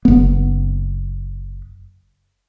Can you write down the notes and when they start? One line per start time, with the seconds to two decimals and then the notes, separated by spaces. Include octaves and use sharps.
0.05 F#1 B3